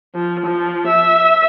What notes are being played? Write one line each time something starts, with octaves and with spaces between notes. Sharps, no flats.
F3
F3
E5